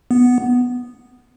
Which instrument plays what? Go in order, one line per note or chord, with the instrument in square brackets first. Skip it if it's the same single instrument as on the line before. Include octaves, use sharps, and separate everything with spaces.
[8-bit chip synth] B3